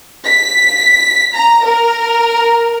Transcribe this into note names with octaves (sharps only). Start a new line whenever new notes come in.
B6
A#5
A#4